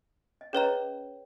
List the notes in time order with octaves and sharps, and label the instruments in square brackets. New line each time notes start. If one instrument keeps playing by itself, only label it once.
[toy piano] D#5
[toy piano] C#4 C#5 [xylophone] G#4 B4 D#5 A#5